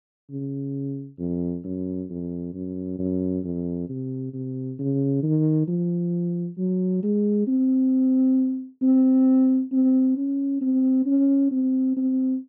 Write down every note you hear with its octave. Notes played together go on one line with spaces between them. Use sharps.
C#3
F2
F#2
F2
F#2
F#2
F2
C3
C3
C#3
D#3
F3
F#3
G#3
C4
C4
C4
C#4
C4
C#4
C4
C4